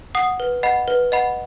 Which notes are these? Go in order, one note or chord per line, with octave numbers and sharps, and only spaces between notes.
F#5 D#6
B4
D#5 F#5 B5
B4
D#5 F#5 B5